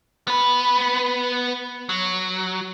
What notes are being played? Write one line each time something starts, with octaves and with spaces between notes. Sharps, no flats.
B3 B4
F#3